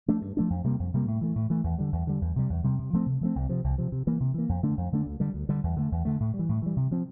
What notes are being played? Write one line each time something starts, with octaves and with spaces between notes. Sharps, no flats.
F3 A3 D4
G2
F3 A3 D4
F2
C3 G3 A#3
F2
C3 G3 A#3
A2
E3 A3
A2
E3 A3
E2
D3 G3
E2
D3 G3
E2
C3 G3
E2
C3 G3
C3
F3 A3 C4
C3
F3 A3 C4
C2
C3 F3
C2
C3 F3
C3
E3 A#3
C3
E3 A#3
F2
D3 A3 D4
F2
D3 A3 D4
D2
D3 G3
D2
D3 G3
E2
D3 A3
E2
D3 A3
A2
G3
E3
A2
E3 G3
C3
F3 C4